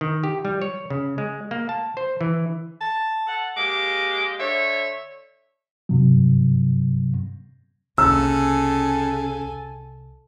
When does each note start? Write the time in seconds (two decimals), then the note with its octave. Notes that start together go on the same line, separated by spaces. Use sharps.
0.01 D#3
0.23 G4
0.45 G3
0.62 C#5
0.90 C#3
1.18 G#3
1.51 A#3
1.69 A5
1.97 C5
2.21 E3
2.81 A5
3.27 A4 F#5
3.57 G#3 A#3 G4 D6
4.39 D3 C#5 E5
5.89 G2 C3 F#3
7.98 C2 C#3 A#3 A4 G#5 E6